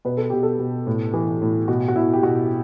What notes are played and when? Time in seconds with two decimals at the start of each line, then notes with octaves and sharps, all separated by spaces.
0.05 B2 B4
0.17 A4
0.30 B2 G4
0.43 A4
0.59 B2
0.87 A2
1.14 E3
1.42 A2
1.68 B2 F#4
1.88 F#4
1.96 B2 E4
2.13 G4
2.23 B2 F#4